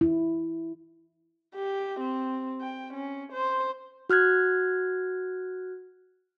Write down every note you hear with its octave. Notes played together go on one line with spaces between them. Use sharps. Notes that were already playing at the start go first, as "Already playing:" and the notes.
E4
G4
C4
G5
C#4
C5
F#4 F6 F#6 G#6